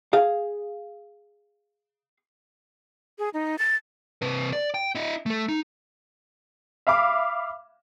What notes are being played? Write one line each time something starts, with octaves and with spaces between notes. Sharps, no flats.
G#4 F5
G#4
D#4
A6
C3 B4
D5
G5
E4 D#5
A3 A4
D#4
E5 F5 B5 D6